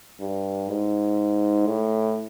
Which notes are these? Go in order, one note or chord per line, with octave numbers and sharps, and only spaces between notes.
G2
G#2
A2